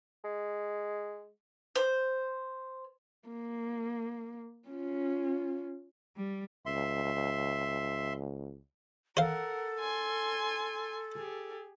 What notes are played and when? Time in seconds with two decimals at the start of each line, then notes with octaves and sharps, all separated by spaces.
0.24 G#3
1.75 C5
3.28 A#3
4.68 C#4 F4
6.16 G3
6.66 C#2 E5 C6
9.17 A4 A#4 C5 F5 F#5
9.80 G#5 C6
11.15 G4 G#4